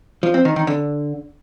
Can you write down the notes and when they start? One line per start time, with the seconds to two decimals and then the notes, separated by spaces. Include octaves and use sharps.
0.23 F3
0.34 C4
0.45 D#3
0.56 D#3
0.67 D3